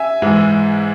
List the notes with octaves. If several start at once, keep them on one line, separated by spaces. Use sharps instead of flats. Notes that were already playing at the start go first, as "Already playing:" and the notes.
Already playing: E5 G#5
G#2 E3 G#3